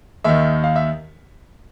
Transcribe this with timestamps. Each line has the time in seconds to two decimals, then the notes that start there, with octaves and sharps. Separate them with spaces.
0.24 D#2 D#3 E5
0.64 F5
0.76 E5